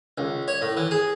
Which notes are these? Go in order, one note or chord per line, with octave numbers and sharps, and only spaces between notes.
C#2
C#5
A2
E3
G#4